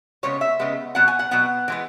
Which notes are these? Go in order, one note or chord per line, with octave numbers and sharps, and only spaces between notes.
C#3 G#3 B3 C#5
E5
C#3 G#3 B3
B2 F#3 B3 F#5
G#5
F#5
B2 F#3 B3 F#5
E3 G#3 B3